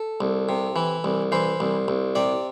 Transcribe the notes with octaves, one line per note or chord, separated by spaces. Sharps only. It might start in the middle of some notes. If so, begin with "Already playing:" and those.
Already playing: A4
C2
C3
E3
C2
E3 C5
C2
C2
C3 D5